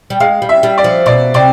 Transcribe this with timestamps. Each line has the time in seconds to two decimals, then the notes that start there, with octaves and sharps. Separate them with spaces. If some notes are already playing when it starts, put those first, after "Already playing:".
0.10 G3
0.20 G#3 F5
0.42 G3
0.49 E5
0.63 G3
0.78 D5
0.84 F3
1.06 B2 D5
1.34 C3 D5